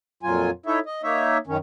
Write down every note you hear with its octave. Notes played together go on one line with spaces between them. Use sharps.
F2 A#2 F#3 F4 G#5
D#4 E4 A4 C#5 E5
D#5
A#3 D#4 C#5 E5
F#2 D#3 C#4